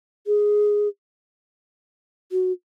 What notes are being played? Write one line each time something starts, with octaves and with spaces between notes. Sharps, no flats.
G#4
F#4